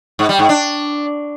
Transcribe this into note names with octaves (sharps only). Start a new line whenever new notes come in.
G#2
G3
G#2
D4